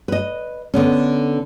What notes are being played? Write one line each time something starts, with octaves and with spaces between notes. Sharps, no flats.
B4 D#5
D3 B3 C#4